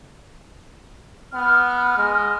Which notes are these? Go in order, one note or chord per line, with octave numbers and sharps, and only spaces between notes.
B3 F6
G#3